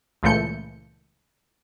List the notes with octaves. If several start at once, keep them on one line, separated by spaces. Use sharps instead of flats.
C#2 A#2 E3 A3 G6 C#7